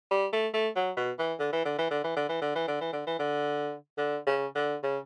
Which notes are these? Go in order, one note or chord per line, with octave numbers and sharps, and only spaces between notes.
G3
A3
A3
F#3
B2
E3
D3
E3
D3
E3
D3
E3
D3
E3
D3
E3
D3
E3
D3
E3
D3
D3
C#3
D3
C#3